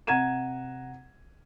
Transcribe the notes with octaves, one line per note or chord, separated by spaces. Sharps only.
C3 F#5 A#5 G#6 D#7 E7